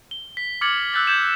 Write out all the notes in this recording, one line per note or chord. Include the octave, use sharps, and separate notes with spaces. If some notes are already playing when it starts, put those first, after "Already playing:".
G7
B6
D6 F6 G#6 A6 C#7 F#7
E6 F#6 G6 A6 B6
G6 G#6 E7 F#7